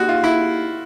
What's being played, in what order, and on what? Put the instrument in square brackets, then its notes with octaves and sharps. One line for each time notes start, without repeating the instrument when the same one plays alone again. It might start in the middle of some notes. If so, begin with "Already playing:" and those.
Already playing: [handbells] A#3 D#4 G4 [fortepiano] F#4
[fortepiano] F4
E4